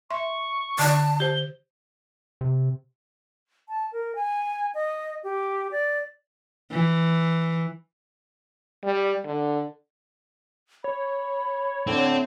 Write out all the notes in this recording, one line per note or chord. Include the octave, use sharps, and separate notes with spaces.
E5 C6 C#6
D3 D5 A5
G4 C5 G7
C3
A5
A#4
G#5
D#5
G4
D5
E3
G3
D3
C#5 B5
A2 D3 C4